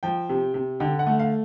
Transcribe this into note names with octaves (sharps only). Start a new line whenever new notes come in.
F3 G5
C3
C3
D3 G5
F#5
A3
F5